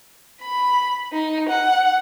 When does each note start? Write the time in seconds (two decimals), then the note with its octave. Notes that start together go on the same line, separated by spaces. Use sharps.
0.42 B5
1.14 D#4
1.49 F#5